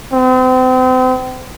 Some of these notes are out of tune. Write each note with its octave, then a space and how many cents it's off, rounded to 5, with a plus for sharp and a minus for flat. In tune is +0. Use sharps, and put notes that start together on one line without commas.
C4 -35